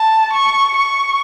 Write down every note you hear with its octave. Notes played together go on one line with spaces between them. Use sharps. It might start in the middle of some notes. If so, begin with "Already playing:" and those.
Already playing: A5
C#6
C#6